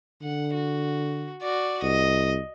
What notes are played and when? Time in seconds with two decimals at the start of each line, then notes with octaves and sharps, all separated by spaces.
0.23 D3 F#5
0.54 F#4
1.42 F#4 D5
1.82 C2 D#5